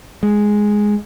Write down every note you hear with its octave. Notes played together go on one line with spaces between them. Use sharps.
G#3